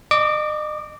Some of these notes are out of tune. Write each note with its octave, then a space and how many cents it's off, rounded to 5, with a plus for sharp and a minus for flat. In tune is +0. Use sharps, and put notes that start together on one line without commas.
D#5 -40 D6 -10